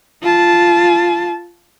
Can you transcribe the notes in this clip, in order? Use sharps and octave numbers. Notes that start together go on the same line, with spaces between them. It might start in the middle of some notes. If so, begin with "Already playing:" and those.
F4 A5